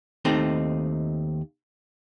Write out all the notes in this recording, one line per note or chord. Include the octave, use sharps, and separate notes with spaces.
D#2 A3 C4 D#4